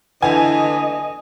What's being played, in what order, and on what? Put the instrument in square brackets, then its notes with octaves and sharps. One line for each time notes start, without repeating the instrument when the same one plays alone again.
[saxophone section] D3 E3 [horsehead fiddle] D#5 [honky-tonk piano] G#5